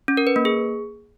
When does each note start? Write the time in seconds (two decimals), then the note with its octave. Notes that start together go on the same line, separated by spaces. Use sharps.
0.08 C#4
0.17 A#4
0.27 B4
0.36 A#3
0.45 G#4